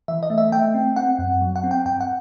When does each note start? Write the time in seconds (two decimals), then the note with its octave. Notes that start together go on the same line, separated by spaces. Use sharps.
0.08 E3 E5
0.23 D#5
0.30 A3
0.38 E5
0.52 A3 G5
0.74 C4
0.96 C4 F#5
1.19 F#2
1.41 F#3
1.56 F#5
1.63 C4
1.71 G5
1.85 G2 G5
2.01 F#5